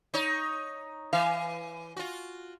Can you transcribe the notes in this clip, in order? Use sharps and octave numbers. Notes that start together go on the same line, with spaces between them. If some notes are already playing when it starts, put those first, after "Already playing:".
D#4 C#5
E3 F5
F4 F#4